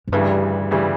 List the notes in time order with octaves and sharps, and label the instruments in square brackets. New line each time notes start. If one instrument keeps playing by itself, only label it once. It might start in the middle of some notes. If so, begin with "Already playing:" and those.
[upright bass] F#2
[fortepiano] D2 C#3 E3 G3 [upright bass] G2
[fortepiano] D2 C#3 E3 G3